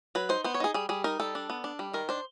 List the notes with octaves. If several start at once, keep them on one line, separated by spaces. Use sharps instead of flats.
F#3 B4
D#4 C5
B3 C5
C#5
D#4 G#4
G3 G#4
G3 G#4
D#4 A#4
G3 A4
D4
B3
D4
G3
D#3 A#4
D4 C5